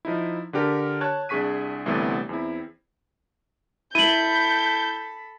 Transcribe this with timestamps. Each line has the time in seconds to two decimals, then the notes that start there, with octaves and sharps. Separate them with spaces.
0.05 F3 D#4 E4
0.53 D3 D4 G4 A#4
1.01 C#5 A5 F#6 G#6
1.29 C2 D4 G#4 C#6 B6 D#7
1.85 G1 C2 C3 E3 A3 B3
2.29 E2 C4 E4
3.95 E4 A4 B5 G6 D#7 F#7